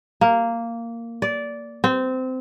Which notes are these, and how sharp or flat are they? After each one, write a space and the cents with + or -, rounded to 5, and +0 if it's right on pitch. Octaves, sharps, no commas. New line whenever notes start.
A#3 -10
D5 -15
C4 -20